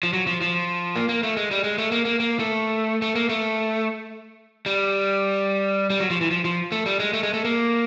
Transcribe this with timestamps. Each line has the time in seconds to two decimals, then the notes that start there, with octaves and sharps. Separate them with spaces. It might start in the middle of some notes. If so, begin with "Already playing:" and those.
0.03 F3
0.13 F#3
0.27 F3
0.41 F3
0.96 A#3
1.09 A#3
1.23 A3
1.37 G#3
1.51 G3
1.64 G#3
1.78 A3
1.92 A#3
2.05 A#3
2.20 A#3
2.39 A3
3.02 A3
3.15 A#3
3.29 A3
4.66 G3
5.90 G3
6.00 F#3
6.10 F3
6.21 E3
6.31 F3
6.45 F3
6.72 A3
6.86 G3
7.00 G#3
7.13 A3
7.23 G#3
7.34 A3
7.45 A#3